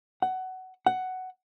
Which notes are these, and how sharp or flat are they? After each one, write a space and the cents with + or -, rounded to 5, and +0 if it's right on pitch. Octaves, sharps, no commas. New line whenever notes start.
F#5 +15
F#5 +10